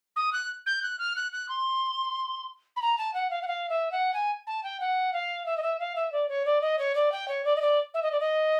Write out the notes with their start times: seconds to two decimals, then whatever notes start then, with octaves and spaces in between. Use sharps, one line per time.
0.16 D#6
0.33 F#6
0.66 G6
0.82 F#6
0.99 F6
1.16 F#6
1.32 F#6
1.49 C6
2.76 B5
2.82 A#5
2.98 A5
3.14 F#5
3.30 F5
3.42 F#5
3.47 F5
3.69 E5
3.91 F#5
4.14 G#5
4.47 A5
4.63 G5
4.80 F#5
5.13 F5
5.46 E5
5.57 D#5
5.62 E5
5.79 F5
5.95 E5
6.12 D5
6.29 C#5
6.45 D5
6.61 D#5
6.79 C#5
6.95 D5
7.12 G5
7.28 C#5
7.45 D5
7.56 D#5
7.61 D5
7.94 E5
8.03 D#5
8.12 D5
8.20 D#5